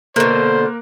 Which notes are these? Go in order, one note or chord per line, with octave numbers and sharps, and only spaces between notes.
B2 D3 A#3 A#4 C5 F#6